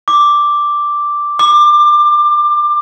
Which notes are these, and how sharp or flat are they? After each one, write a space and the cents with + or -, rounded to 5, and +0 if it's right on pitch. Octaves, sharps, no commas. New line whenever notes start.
D6 +0
D6 +25